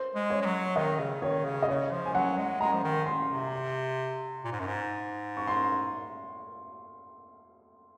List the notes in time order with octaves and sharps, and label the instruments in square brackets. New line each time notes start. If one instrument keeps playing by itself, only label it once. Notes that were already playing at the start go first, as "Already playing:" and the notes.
Already playing: [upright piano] C5
[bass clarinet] G#3
[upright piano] C#5
[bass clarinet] G#3
F#3
[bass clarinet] D#3 [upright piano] D#5
[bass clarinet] C#3
[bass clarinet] D#3 [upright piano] C#5
[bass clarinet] C#3
[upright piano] D#5
[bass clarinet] C#3 [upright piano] C#5
[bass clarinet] F3
[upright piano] G#5
[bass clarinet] F#3 [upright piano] F#5
[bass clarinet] G#3
[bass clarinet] G#3 [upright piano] A#5
[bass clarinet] F3
D#3
[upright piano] C6
[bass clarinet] C3
A#2
G#2
F#2
G#2
[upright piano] C#6
C6